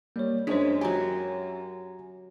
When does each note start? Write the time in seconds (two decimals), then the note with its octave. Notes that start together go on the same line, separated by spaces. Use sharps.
0.16 G3 A#3 C#5
0.47 F#2 G#3 D4 D#4 C5 C#5 B6
0.81 F#3 G4 G#5 A#5